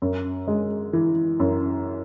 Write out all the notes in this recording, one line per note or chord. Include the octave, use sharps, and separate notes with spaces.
F#2
G#3
E3
F#2